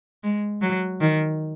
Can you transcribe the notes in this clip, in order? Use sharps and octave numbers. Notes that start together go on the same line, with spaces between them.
G#3
F#3
D#3